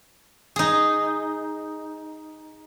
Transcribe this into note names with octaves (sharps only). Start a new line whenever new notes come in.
D#4 G#4